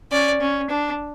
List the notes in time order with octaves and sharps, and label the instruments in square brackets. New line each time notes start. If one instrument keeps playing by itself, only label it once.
[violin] C#4 [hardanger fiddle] D5
[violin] C#4
D4